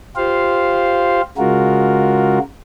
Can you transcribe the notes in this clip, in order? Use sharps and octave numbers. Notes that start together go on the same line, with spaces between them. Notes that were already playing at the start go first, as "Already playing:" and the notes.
F4 G4 C5 F5
C#3 G#3 F4 F#4 A#4